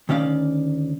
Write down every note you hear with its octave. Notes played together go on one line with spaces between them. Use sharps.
D2 D#3 C#4 D5 F5